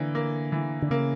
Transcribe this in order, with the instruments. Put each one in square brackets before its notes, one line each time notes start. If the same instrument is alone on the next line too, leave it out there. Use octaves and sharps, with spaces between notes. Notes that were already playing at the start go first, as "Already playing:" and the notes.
Already playing: [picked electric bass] D3 [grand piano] E3 A#3
[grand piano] A#3
E3
[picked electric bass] D3
[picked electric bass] C#3 [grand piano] A#3